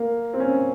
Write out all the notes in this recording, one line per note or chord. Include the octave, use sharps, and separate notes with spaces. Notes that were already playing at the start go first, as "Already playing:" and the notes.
Already playing: A#3
C4
C#4